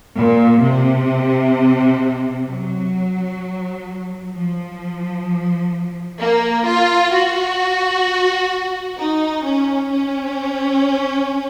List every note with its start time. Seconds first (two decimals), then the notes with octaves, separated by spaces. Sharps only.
0.17 A#2
0.63 C3
2.49 F#3
4.34 F3
6.21 A#3
6.67 F4
7.13 F#4
8.99 D#4
9.45 C#4
9.92 C#4